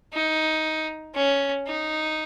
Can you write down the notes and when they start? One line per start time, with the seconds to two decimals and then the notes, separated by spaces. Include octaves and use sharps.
0.14 D#4
1.15 C#4
1.67 D#4